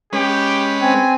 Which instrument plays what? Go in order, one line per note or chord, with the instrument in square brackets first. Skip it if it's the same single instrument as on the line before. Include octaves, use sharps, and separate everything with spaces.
[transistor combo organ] G#3 C#4 B4 [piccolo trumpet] G4
[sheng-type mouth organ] C4 [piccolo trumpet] G#5